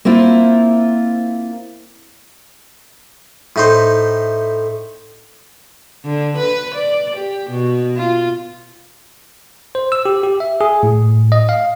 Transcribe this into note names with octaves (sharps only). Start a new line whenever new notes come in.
A#3 C4 E4 F4
A2 D#4 C5
D3
B4
D5
G4
B2
F4
C5
E6
G4
G4
E5
G#4
A2
D#5
F5